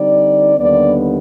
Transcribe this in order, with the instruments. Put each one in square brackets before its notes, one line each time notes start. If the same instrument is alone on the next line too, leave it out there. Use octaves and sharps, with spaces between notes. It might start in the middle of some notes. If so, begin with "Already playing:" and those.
Already playing: [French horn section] D3 G3 C4 D#4 D5
D#2 D3 G3 B3 D4 D5